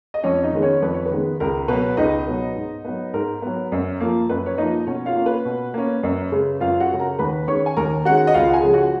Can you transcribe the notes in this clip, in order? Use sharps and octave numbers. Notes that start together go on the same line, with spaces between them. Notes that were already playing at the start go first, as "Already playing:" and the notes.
D#5
F2 C#4 C#5
D#4 D#5
D#3 G#3 B3
C#4 C#5
F2 B4
C#5
B4
D#3 G#3 B3
C#2 A#4
B2 F#3 B3 B4
C#2 D#4 D#5
B2 F#3 B3
G#2
F#3 B3
G#2 A#4
F#3 B3
F#2
F3 A#3
F#2 B4
C#5
F3 A#3 D#4 D#5
B2 C#4 C#5
F4 F5
A#3 C#4
B4
B2
A#3 C#4
F#2
C#3 G#3
F#2 F4 F5
F#4 F#5
C#3 G#3
A#4 A#5
D#2 B4 B5
D#3 G#3 C#4 C#5 C#6
G#5
D#2 A#4 A#5
D#3 G#3 C#4 F#4 F#5
D#5
C#2 F4 F5
F#5
G#4 G#5
C#3 F3 G#3
F#4 F#5